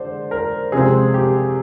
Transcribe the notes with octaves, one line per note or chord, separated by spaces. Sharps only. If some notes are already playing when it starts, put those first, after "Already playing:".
Already playing: D3 G#3 C5 D5
A#4
C3 F3 G#3 C4 G#4
G4